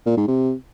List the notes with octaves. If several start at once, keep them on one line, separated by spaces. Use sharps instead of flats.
A#2
G#2
C3